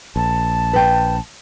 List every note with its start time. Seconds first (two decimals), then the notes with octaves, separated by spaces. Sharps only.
0.16 A#1 A5
0.73 B4 G5